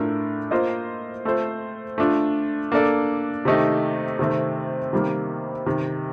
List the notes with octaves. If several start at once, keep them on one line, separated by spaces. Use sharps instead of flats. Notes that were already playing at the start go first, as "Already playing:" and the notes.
Already playing: A2 A3 D4 F4 A#4
A#3 F4 C5 D#5
A3 C4 F4 C5
A3 D4 F4
A#3 D4 A4 D5
C3 D#3 A3 D#4 G4
C3 D#3 A3 C4
C3 D#3 G3 A#3
C3 D#3